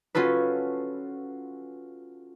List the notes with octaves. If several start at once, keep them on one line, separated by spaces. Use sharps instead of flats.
C#4 F4 F#4 A4 B4